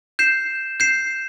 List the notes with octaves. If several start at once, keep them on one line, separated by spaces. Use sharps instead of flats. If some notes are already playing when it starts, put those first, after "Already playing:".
G6 C7 E7
G6 C7 E7